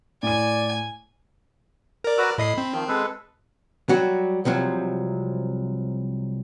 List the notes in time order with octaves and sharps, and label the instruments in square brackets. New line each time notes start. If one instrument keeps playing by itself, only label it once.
[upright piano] A2 D#7 [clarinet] D5 [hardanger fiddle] G#5
[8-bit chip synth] A#4 D5
[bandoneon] F#4 B4 E6
[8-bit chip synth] A2 D#5 C7 [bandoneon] B5
[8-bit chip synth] C4
[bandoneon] D#3 F3
G#3 A4 B4
[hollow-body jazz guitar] F#3 G3 F#4
C2 C3 F3 F#3